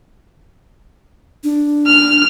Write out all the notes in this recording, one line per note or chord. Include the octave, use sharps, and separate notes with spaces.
D4
F6